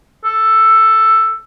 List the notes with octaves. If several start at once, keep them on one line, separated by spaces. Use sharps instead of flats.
A4